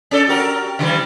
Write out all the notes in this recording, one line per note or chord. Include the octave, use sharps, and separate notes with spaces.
C#4 D4 A4
F#4 G4 A#4
C#3 E3 G3